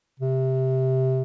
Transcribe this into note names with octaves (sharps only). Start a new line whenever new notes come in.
C3